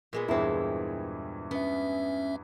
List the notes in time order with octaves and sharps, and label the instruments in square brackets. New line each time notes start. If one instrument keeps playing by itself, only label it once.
[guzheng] A#2 G#3 B3
[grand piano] E2 G2 E3 [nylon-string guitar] C4 E4
[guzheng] B3 [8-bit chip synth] C#4 E5